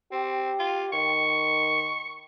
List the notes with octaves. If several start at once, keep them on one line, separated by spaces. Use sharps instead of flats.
C4 G4
F4
D#3 C#6